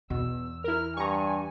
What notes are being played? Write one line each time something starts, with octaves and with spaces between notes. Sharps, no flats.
E2 B2 E6
E4 A#4 F6
G2 G#5 A#5 C#6